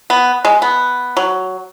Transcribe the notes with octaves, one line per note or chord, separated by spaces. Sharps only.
B3
G#3
B3
F#3